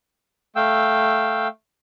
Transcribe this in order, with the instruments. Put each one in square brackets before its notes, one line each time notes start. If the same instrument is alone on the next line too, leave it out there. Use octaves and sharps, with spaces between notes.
[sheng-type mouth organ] A3 F5 G5 E6